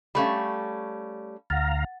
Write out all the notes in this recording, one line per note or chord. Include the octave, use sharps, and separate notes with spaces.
G3 A3 C#4 F5 B5
D2 F5 F#5 A#5 A6